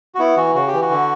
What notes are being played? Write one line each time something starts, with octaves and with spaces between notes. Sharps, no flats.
F#4
B3 E4
E3 F#4
C#3 F#4
G4
E3
F#4
D3